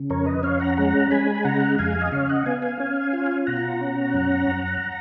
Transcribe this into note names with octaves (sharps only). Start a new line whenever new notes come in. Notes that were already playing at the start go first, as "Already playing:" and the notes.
Already playing: C#3
F2 A#4 C#5
B4 D#5
C#4 C#5 F5
F#5 A#5
G#3 F#5 A#5
G#3 G#5 B5
G#5
C#3 F#5 A#5
F2 F5 G#5
D#5
C#3 C#5 F5
D#5 F#5
B3 F5 G#5
F5 G#5
C#4
F4
B2 F#5 A#5
C#4
F#2
F#2